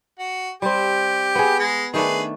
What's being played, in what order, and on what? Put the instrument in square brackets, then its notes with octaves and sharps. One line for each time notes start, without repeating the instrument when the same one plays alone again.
[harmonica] F#4
[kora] G3 C4 [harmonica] G4
[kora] B3 G#4
[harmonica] G#3
[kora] D#3 A3 D4 [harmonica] G#4 B4